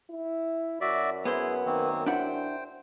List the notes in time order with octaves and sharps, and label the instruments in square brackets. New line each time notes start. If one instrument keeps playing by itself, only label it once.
[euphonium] E4
[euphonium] F#2 [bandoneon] F#4 D5 E5
[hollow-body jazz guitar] B3 C5 [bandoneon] E4 G#4
[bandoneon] D#3 A#3 C4
[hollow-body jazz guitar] D4 E4 F#5 [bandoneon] C5 G5